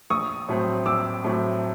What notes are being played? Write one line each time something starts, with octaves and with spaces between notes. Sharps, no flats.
A#1 C#6 D#6
A2 F#3 A3 C4
A#1 D6 E6
A2 F#3 A3 C4